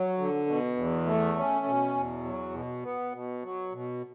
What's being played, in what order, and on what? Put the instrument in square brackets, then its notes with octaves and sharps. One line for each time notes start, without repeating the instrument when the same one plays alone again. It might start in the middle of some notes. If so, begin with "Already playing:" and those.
Already playing: [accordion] F#3
D3
B2
E2
A3
C#4
B2
E2
F#3
B2
B3
B2
F#3
B2